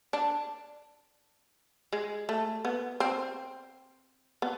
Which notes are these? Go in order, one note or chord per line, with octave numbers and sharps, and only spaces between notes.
D4
G#3
A3
B3
C4
B3